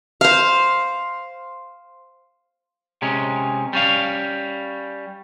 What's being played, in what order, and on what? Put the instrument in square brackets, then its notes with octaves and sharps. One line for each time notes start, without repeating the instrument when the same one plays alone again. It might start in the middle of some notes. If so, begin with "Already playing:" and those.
[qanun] C5 F5
[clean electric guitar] C3 G#3 C#4
G3 C#4 F5